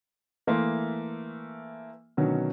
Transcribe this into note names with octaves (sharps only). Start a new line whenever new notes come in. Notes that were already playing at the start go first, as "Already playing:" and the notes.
E3 A3 A#3 E5 C6
B2 D3 D#3 F#3 C#4